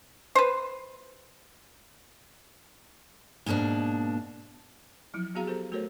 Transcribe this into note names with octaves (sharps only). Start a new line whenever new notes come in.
B4 C5
G#2 B2 A#3 C4 D4
F3 F#3 E4
F#3 B3 F#4 G#4 F5 A#5
G4 A4 C5
A3 F#4 A4 A#4 C5 C#5